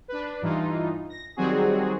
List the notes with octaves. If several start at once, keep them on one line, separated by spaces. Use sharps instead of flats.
D4 B4
G2 E3 D#4 F4
A#6
D#3 F#3 G3 C4 F#4 G#4